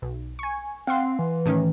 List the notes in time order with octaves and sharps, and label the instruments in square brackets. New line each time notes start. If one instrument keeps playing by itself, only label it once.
[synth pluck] B1
G#5 C#6
[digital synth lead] C4 [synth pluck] F5 F#5 C6
[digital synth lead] E3
[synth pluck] A2 D#3 C#4